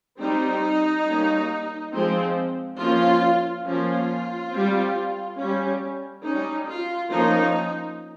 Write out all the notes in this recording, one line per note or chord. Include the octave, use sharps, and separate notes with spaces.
G3 C4 D#4
G3 A#3 C#4
F3 G#3 C4
F3 A#3 C#4 F4
F3 A#3 C#4 F4
G3 C4
G3 C#4
C#4 D#4
G3
F4
F3 A#3 C#4 D#4